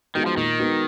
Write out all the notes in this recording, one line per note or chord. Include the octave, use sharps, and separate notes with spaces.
D#3 G#3 B3 D#4 F#4
F3
A#2 D#3
G#3 B3 D#4 F#4